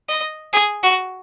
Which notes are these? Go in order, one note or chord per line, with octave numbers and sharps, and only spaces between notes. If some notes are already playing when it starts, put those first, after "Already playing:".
D#5
G#4
F#4